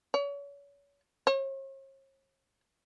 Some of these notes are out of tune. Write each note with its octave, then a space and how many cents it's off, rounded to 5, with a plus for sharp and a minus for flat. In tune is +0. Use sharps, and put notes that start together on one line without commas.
C#5 +35
C#5 -45